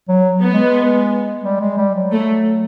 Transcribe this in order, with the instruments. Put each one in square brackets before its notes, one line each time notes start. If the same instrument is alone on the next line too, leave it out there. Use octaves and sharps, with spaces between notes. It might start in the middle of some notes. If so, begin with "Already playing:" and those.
[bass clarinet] F#3
[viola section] B3
[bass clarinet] G#3
G3
G#3
G3
F#3
[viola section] A3